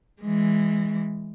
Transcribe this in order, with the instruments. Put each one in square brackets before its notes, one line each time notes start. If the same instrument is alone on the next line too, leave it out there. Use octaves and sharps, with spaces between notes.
[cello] E3 G#3